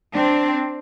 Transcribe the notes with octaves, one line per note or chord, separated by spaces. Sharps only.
C4 D4